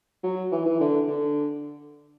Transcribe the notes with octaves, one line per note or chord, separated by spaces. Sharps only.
F#3
E3
E3
D3
D3